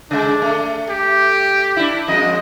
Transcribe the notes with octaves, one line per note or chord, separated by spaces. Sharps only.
C#3 G#3 D4
A3
G4
D4 E4
F2 G#3 D#5